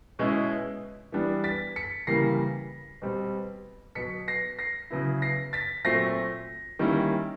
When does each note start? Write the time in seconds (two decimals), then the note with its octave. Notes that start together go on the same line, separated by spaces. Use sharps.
0.19 B2 G#3 C#4 E4
1.12 E3 G3 B3 D4
1.44 A6 B6
1.76 B6 C#7
2.07 C#3 E3 G3 A#3 A#6 C7
3.02 B2 G3 C4
3.95 B2 F#3 B3 B6 C#7
4.28 A#6 C7
4.59 A#6 C7
4.90 C#3 F#3 B3 E4
5.22 A#6 C7
5.53 A6 B6
5.85 A#2 F#3 A3 C4 A#6 C7
6.79 D#3 G3 A#3 C#4 E4